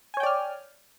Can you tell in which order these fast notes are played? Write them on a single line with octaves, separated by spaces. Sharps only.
G#5 C#5 G5 D5 F6